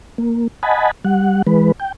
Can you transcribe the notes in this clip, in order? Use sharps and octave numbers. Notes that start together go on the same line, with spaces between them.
A#3
D#5 F#5 G#5 A5 B5
G3 F#5
E3 G#3 B4
G5